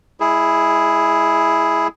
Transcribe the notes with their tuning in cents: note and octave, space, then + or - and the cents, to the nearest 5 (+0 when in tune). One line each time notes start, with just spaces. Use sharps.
G#3 -30 E4 +0 G#4 +5